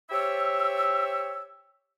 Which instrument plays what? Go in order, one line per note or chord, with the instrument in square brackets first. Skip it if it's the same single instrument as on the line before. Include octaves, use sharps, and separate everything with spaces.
[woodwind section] G4 C5 C#5 E5 E6